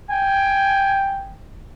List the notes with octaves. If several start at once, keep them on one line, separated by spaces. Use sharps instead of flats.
G5 G#5